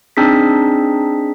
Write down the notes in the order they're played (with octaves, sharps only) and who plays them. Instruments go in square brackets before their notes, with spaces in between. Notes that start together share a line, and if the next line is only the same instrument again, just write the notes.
[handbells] C4 D4 D#4 G#4 B6